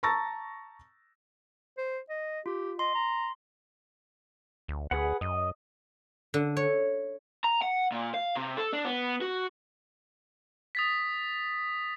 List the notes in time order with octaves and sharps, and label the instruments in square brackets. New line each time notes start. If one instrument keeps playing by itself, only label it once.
[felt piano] A5 A#5 C#6 E6 A6 A#6
[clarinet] C5
D#5
[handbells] F4 [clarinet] G4
[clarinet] D#5 [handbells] C6
[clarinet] A#5
[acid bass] D2
[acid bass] D2 [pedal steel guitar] G#4 B4 F#5
[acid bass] F#2 [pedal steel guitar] D#5
[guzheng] D3
C#5
[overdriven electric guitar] A#5
F#5
A#2
F5
C3
A4
D4
B3
F#4
[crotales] D#6 A6 B6